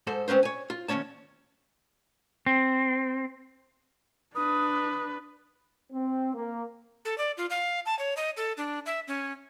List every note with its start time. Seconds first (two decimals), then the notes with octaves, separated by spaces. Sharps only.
0.07 G#2 A4 C5
0.28 G#3 C4 C#4 B4 C5
0.43 C#5 G#5
0.70 F4
0.88 D#2 D#3 C#4 C#5 A5
2.46 C4
4.35 D4 B4 D#6
5.93 C4
6.34 A#3
7.05 A4
7.18 D5
7.37 F4
7.50 F5
7.86 A5
7.99 C#5
8.17 D#5
8.37 A4
8.57 D4
8.86 E5
9.08 C#4